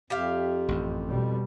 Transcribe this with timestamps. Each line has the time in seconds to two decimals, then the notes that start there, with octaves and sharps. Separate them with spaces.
0.10 F2 G4 E5 F5
0.69 A1 F#2
1.09 B2 G3